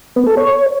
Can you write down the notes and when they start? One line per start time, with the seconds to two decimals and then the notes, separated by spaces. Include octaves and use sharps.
0.16 B3
0.27 A4
0.37 C#5